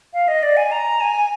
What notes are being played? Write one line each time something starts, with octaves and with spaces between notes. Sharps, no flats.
F5
D#5
D5
G#5
A#5
G#5